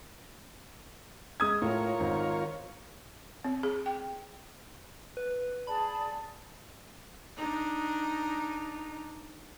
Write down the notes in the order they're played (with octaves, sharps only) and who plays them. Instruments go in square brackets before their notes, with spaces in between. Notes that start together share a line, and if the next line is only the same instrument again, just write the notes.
[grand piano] G#3 D#6 G#6
[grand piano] A2 [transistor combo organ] F4 A#4 C#5
[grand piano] G#1
[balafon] C4
G#4
G5
[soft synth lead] B4
[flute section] G#4 D5 A5 [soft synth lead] B5
[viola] D4 D#4